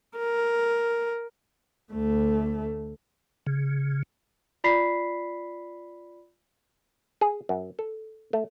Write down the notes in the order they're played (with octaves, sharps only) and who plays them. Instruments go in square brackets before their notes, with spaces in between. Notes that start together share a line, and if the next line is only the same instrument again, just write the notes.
[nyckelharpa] A#4
[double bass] D2 A3
[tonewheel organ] C#3
[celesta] F4 D5 B5 B6 C7
[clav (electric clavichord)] G#4
F#2
A4
A3